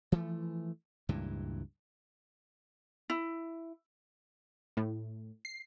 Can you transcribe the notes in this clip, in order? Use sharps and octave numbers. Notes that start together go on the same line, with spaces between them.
E3 F3 A3
C#2 G2 A#2 E3
E4
A2
C7